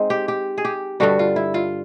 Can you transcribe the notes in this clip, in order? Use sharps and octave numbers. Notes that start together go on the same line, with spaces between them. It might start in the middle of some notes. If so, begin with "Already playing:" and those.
Already playing: G#3 C4 D#4
G4
G4
G#4
G4
G2 D3 G3 F#4
F4
E4
F4